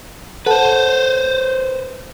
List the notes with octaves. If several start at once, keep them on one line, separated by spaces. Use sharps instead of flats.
A4 B4 C5 F#5 A5